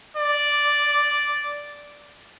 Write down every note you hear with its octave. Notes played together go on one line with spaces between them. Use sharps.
D5